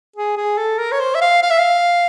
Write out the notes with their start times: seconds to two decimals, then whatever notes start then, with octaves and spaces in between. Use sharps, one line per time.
0.16 G#4
0.37 G#4
0.57 A4
0.78 A#4
0.91 C#5
1.00 C5
1.15 E5
1.21 F5
1.42 F5
1.50 E5
1.58 F5